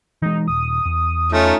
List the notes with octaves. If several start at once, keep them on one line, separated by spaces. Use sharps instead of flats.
E3 G#3 D#4
D#1 D#6
E2
A3 C#4 D#4 F4